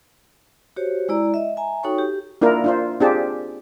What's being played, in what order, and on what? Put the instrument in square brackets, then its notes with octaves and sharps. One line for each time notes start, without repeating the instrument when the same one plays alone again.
[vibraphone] F#4 G4 C5 C#5
G#3 E4 D5 A#5 E6
D#5 E5
E5 G#5 A#5
D#4 F#4 A4 C#5 G5 C#6
G4
[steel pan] A#3 D4 E4 F4 A#4
D4 F4 C5
C4 D4 F4 G4 G#4 A5